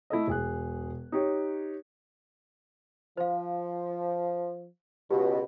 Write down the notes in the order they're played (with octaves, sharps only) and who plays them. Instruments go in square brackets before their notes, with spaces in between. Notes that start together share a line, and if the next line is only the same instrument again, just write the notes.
[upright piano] A3 E4 A4 D#5
E1 G#4 F#6
D#4 G4 C#5
[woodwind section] F3 [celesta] C5 F5
[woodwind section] C#2 B2 [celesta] G4